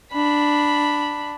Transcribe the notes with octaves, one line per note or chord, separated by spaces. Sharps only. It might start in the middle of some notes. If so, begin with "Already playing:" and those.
D4 B5